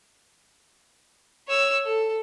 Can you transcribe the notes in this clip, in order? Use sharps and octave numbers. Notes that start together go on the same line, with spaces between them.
C#5 E6
A4